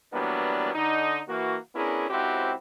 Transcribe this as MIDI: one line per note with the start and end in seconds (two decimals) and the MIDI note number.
0.13 0.73 52
0.13 0.73 54
0.13 0.73 55
0.13 0.73 58
0.13 0.73 59
0.13 0.73 62
0.74 1.20 50
0.74 1.20 63
1.28 1.57 52
1.28 1.57 58
1.28 1.57 66
1.75 2.06 59
1.75 2.06 61
1.75 2.06 62
1.75 2.06 64
1.75 2.06 68
1.75 2.06 70
2.10 2.52 37
2.10 2.52 60
2.10 2.52 64
2.10 2.52 66
2.10 2.52 67
2.10 2.52 72